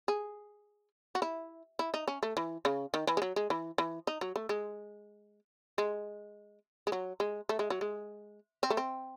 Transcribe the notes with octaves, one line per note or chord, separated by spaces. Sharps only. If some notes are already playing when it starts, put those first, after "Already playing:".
G#4
F#4
E4
E4
D#4
C#4
A3
E3
C#3
D#3
E3
G#3
F#3
G#3
E3
E3
D#4
F#3
A3
G#3
G#3
G#3
F#3
G#3
A3
G#3
F#3
G#3
C4
A3
C4